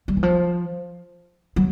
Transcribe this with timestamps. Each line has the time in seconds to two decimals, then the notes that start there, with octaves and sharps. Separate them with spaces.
0.08 G3
0.17 E3
0.23 F3
1.56 F#3